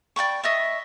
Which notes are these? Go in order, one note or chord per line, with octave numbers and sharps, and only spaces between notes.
D5 G5 B5 C#6
D#5 E5 C#6